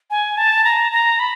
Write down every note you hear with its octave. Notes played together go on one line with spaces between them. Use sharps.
G#5
A5
A#5
A#5
B5